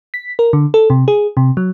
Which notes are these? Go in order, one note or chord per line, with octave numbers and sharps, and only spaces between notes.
B6
A#4
D3
A4
C3
G#4
C3
F#3